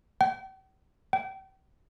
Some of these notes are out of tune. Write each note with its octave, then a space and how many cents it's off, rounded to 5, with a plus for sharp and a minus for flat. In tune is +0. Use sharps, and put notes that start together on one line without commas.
G5 -45
G5 -35